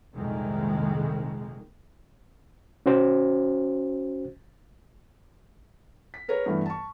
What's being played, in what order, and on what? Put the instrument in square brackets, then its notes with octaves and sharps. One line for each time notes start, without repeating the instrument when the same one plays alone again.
[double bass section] C2 F2 A#2 D#3 G#3 A#3
[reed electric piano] C#4 F#4 C5
[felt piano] B6
G#4 A#4 B4 C#5
G2 E3 A3 B3
A5 C#6